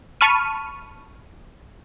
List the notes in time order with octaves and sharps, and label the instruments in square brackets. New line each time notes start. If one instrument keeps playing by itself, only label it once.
[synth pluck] A5 B5 C#6 F6 D#7